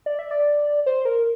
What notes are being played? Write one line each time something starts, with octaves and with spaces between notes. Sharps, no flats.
D5
E5
D5
C5
A#4